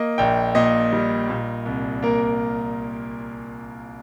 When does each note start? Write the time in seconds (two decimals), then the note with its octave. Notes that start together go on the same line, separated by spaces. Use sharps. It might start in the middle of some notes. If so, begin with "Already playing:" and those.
Already playing: A#3 D#5
0.18 A#1 G5
0.55 A#2 D#5
0.92 G3
1.30 A#2
1.66 C2
2.02 A#3 A#4